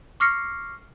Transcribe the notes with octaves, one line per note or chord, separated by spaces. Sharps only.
C#6 D6 F6 A#6 C7 C#7